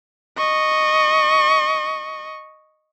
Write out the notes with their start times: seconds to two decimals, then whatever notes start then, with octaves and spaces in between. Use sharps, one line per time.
0.37 D#5 C#6